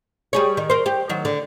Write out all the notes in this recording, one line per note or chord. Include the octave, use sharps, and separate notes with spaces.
G3 G#4 C#5
D#3
A#4 C5
G4
D#3 F#3
D3